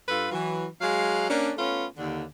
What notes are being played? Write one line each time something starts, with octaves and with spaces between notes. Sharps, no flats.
G2 F4 A4 B4
E3 F#3
F#3 G#3 F5
A#3 C#4 D4
A3 B3 C#4 F4
D#2 D3